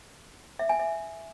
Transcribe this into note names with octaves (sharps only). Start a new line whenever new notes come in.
E5
G#5
E5